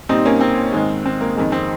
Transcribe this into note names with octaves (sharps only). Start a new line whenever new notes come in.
A#2 G3 C4 D#4
A#3 C#4
C4
G#2 D#3 G#3
C4
A#3
F2 D#3 G#3
C4